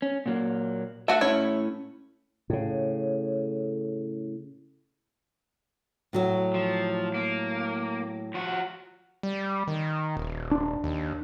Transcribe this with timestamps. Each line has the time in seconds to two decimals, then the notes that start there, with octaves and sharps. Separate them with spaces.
0.02 C#4
0.26 A#2 F#3 A#3
1.08 A3 F#4 E5 F#5
1.21 A2 C#4 E4 C#5
2.50 A2 C#3
6.13 A2 F#3 F#4
6.54 F3
7.14 A#3
8.34 F3 F#4
9.23 G3
9.67 D#3
10.17 D#1
10.51 D4
10.84 D#2